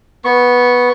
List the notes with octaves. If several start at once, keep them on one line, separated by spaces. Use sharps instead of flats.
B3 C#6